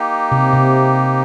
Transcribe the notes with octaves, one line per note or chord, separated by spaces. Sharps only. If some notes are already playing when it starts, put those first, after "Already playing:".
Already playing: A#3 D#4 G4
C3
C3